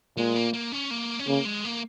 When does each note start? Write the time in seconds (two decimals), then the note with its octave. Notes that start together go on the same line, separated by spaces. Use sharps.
0.17 A#2 G#3
0.36 A#3
0.53 A#3
0.72 C#4
0.91 A#3
1.19 C#4
1.27 C#3 A#3
1.45 G#3
1.64 A#3